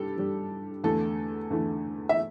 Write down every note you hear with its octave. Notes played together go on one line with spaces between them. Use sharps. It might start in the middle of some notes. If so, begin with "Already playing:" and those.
Already playing: G2 G3 G4 A4
G2 G3
E2 D3 A3 A4
E2 D3 A3
E5